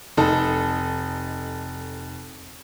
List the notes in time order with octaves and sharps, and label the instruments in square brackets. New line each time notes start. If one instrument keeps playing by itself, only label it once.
[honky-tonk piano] F1 D#4 A4